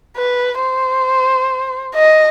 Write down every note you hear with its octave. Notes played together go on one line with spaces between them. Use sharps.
B4
C5
D#5